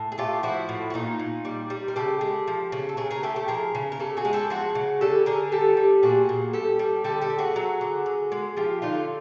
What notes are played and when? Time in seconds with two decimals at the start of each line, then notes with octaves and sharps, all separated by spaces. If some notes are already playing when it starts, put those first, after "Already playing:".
Already playing: A2
0.12 G#4
0.18 A3 F4 G4
0.43 F3 E4 F#4
0.69 A2
0.90 F#4
0.94 A#2 D#4 F4
1.20 A#2
1.45 G3
1.70 G3
1.88 A#4
1.96 C#3 G4 A4
2.21 G#3
2.48 F3
2.72 C#3
2.89 A4
2.97 C#3 G#4 A#4
3.11 G#4 A#4
3.23 A3 G4 A4
3.36 G4 A4
3.48 F3 G#4 A#4
3.75 C#3
3.92 A#4
4.00 C#3 G4 A4
4.17 F#4 G#4
4.25 G#3
4.33 G4 A4
4.50 F3 F#4 G#4
4.75 C#3
5.01 D3 G4 A4
5.26 D3 G#4 A#4
5.52 G3 G4 A4
5.77 G3
6.03 A#2 F#4 G#4
6.29 A#2
6.53 G3 G4 A4
6.79 G3
7.04 D3 G4 A4
7.21 G4 A4
7.30 A3
7.39 F#4 G#4
7.56 F#3
7.81 D3
8.06 D3
8.32 G#3
8.57 F3 F4 G4
8.82 D3 D#4 F4